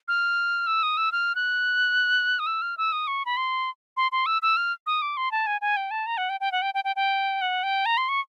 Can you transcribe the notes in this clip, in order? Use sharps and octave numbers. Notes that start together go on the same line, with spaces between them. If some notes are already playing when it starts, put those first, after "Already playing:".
F6
E6
D#6
E6
F6
F#6
D#6
E6
F6
E6
D#6
C#6
B5
C6
C6
C6
E6
E6
F6
D#6
D6
C6
A5
G#5
G#5
G5
A5
A#5
F#5
G5
G5
F#5
G5
G5
G5
G5
F#5
G5
A#5
C6
C#6